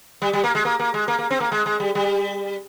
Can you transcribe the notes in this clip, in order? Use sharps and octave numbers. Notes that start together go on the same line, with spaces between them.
G3
G3
A#3
G#3
A#3
A#3
G#3
A#3
A#3
C4
A#3
G#3
G#3
G3
G3